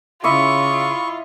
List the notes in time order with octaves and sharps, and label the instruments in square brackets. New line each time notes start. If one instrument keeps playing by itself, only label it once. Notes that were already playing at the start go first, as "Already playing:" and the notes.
[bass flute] C#3 [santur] E4 D#5 D6 [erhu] F4 [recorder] C#6